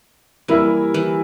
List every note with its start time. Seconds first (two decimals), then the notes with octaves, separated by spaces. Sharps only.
0.48 E3 G3 A#3 E4 A#4 E5
0.94 E3